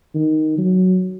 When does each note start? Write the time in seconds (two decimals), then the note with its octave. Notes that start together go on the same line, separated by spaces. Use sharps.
0.15 D#3
0.58 F#3